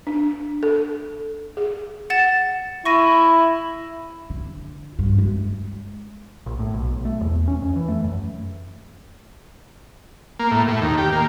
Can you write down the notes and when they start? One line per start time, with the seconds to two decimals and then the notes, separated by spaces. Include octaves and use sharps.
0.07 D4
0.63 A4
1.57 G#4
2.10 F#5 A6 E7
2.85 E4 C#6 A#6 D#7
4.30 D3
4.99 G2 F3
5.18 G#3 A3
6.46 A#1
6.59 A2
6.74 B1
6.92 B1
7.05 A3
7.21 E2
7.48 C#4
7.62 F2
7.76 E3
7.88 A3
8.04 F#2
10.39 A#3
10.51 A2
10.68 A2
10.81 D#2
10.98 G4
11.12 A#3